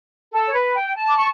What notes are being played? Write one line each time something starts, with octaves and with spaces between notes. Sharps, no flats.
A4
C#5
B4
G5
A5
D6
C#6